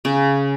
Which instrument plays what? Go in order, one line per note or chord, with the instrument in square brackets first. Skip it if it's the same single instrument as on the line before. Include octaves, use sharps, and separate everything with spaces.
[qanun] C#3